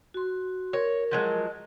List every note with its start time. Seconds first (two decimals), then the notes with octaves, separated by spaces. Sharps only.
0.14 F#4 C6
0.73 A#4 C#5
1.11 F3 F#3 G#3